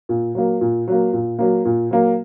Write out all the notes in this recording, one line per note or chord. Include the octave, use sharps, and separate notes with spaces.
A#2
F#3 A#3
A#2
F#3 A#3
A#2
F#3 A#3
A#2
F#3 A#3